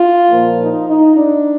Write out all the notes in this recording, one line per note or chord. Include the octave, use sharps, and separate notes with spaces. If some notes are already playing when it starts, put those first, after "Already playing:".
Already playing: F4
A#2 F3 A#3
D#4
D#4
D4